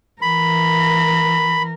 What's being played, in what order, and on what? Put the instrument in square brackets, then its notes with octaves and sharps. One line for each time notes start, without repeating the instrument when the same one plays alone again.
[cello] E3 A#4 [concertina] B5